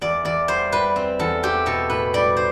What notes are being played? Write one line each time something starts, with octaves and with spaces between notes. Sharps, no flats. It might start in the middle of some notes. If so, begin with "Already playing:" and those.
E2 D5
E2 D5
G3 C5
G3 B4
C4
E2 A4
C4 G4
B2 A4
A2 B4
G3 D5
C5